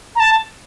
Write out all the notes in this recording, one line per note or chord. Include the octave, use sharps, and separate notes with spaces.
A#5
A5